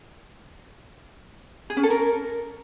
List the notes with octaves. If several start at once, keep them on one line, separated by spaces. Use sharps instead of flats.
G#4
C#4
A4
A#4